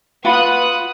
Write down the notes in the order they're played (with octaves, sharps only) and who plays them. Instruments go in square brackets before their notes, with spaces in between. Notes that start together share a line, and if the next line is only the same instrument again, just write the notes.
[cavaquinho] F4 F#4 B5 [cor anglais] B4 [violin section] D#6 F#6